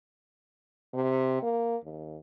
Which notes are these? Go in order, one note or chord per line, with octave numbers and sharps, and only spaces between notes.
C3
A#3
D#2